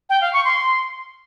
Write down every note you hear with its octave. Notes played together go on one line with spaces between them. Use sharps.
G5
F5
C#6
C6